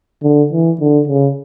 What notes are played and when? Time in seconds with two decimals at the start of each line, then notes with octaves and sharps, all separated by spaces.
0.23 D3
0.52 E3
0.80 D3
1.08 C#3